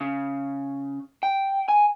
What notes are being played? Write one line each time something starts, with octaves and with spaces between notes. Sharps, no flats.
C#3
G5
G#5